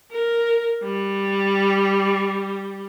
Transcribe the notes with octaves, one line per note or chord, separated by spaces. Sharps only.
A#4
G3